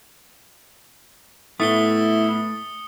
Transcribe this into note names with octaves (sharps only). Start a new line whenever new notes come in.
A2 A3 B3 E4 D#6 C#7 G7